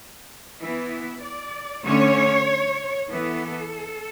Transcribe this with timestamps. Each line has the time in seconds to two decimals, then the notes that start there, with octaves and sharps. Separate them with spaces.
0.59 E3 B3 E4
1.22 D5
1.84 D3 A3 C#4 C#5
3.09 E3 B3 A4